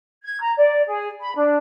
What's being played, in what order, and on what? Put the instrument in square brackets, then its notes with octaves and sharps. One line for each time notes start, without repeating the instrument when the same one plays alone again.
[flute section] G#6
A#5
D5
G#4
B5
D4